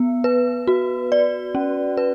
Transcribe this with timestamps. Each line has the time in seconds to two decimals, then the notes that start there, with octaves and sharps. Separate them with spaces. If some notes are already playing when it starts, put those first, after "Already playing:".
Already playing: B3
0.24 B4
0.67 F#4
1.12 D5
1.55 C#4
1.97 B4